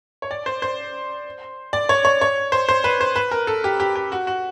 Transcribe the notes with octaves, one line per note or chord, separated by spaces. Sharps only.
C#5
D5
C5
C5
D5
C#5
C#5
C#5
C5
C5
B4
C5
B4
A#4
A4
G4
G4
G4
F#4
F#4